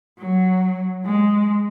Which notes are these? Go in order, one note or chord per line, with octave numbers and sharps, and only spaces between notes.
F#3
G#3